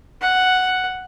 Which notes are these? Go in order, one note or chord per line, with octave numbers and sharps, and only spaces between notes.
F#5